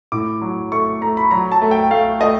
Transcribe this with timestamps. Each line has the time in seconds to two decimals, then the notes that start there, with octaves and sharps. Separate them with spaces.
0.12 A2 D6
0.42 F#3
0.72 A3 C#6
1.02 A3 A#5
1.17 B5
1.31 F#3 A#5
1.52 A5
1.62 A3
1.71 G5
1.91 A3 F5
2.21 A3 D#5